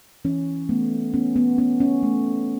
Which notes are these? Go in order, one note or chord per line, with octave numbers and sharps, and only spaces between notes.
E3 C#4
A3 B3
B3 C#4
B3
B3 C#4
C#4
A3